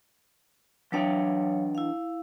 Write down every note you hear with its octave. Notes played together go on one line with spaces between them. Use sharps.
E3 F#3 D4 C#5 F5 G5
E4 F5